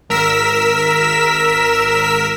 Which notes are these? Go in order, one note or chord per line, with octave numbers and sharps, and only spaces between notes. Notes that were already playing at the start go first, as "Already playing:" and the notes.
G#1 A#4 E6 B6